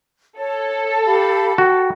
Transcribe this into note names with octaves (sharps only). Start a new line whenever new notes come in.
A4 C#5
G4 F5 B5
F#4 G5